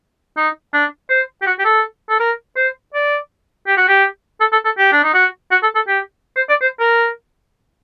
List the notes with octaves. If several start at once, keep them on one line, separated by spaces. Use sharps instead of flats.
D#4
D4
C5
G4
F#4
G4
A4
A4
A#4
C5
D5
G4
F#4
G4
A4
A4
A4
G4
D4
D#4
F#4
F#4
A4
A4
G4
C5
D5
C5
A#4